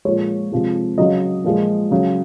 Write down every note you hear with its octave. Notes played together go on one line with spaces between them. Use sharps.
A#2 F3 G#3 C#5
C3 F3 G#3
C#3 F#3 D#5
A#2 F3 G#3
C#3 F#3